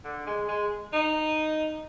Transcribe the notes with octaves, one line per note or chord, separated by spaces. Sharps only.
D3
G#3
G#3
D#4